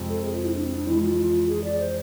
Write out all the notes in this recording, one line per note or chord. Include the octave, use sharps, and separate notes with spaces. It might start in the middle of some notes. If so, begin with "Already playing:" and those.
Already playing: F2 C3 G#3 C4
A4
G#4
F4
E4
D4
C4
D4
F2 E3 G#3 E4
F4
G#4
D5
C5